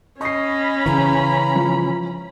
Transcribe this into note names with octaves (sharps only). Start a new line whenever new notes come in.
C#4 D#5 B5 C#6 C7
C#3 E3 A#5
F3